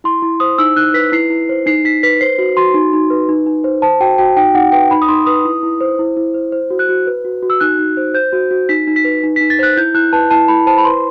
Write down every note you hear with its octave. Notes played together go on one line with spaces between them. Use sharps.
E4 C6
E4
C5 D#6
D#4 E6
D#4 F#6
B4 B6
E4 C7
E4
C5
D#4 C7
D#4 B6
B4 B6
C5 C7
F#4
F#4 C6
D#4
D#4
B4
D#4
D#4
C5
C5 A5
F#4 G5
F#4 G5
D#4 G5
D#4 F#5
B4 G5
D#4 B5
D#6
D#4 C6
B4 D#6
E4
E4
C5
E4
E4
C5
C5
F#4
F#6
F#4
B4
F#4
F#4
E6
D#4 F#6
D#4
C5
C5 G6
F#4
F#4
D#4 B6
D#4
B6
B4
D#4
B6
D#4
A6
C5 F#6
E4 G6
E4 F#6
B4 A5
E4 A5
E4 B5
C5 A5
B5
B4 C6